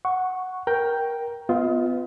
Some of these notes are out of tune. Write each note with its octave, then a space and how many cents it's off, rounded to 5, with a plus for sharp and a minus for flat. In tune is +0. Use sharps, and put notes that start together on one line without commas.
F#5 +0 C#6 +0
A#4 +15 G5 +0
B3 +30 F4 +0 D#5 +35